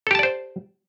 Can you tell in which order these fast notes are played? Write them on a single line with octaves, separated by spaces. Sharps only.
A4 G4 A5 D5 C5